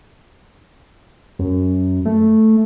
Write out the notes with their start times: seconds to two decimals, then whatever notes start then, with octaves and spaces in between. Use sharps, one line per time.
1.39 F#2
2.06 A3